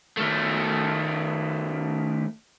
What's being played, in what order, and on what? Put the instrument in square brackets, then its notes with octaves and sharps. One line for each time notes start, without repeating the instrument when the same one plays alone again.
[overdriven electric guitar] D#3 A3